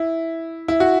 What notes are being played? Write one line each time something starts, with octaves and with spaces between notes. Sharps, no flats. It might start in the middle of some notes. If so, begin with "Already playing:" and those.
Already playing: E4
E4
F#4